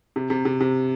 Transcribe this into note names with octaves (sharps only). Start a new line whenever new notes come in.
C3
C3
C3
C3